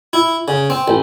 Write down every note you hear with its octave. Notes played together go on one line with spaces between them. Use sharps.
E4
C#3
C4
A1